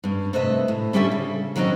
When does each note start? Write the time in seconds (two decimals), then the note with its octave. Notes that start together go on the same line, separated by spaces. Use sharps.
0.04 G2 C#4
0.33 C3 A3 B4 D#5 E5
0.68 A2
0.93 D3 G3 C#4 G4 A4 E5
1.12 C#3
1.56 D#3 F#3 C4 C#4 D#5